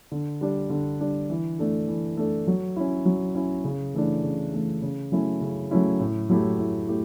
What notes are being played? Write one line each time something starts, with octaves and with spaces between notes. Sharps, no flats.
D3
G3 D4
D3
G3 D4
E3
A3 D4 A4
E3
A3 D4 A4
F#3
C#4 E4
F#3
C#4 E4
C#3
E3 A3 D4
C#3
E3 A3 D4
C#3
F#3 A3 C#4 E4
C#3
F#3 A3 C#4 E4
A2
F#3 A3 E4 G4
A2
A3 E4 G4